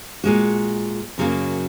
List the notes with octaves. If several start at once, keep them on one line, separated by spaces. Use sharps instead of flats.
A#2 G#3 F#4
F#2 C#3 F#3 A#3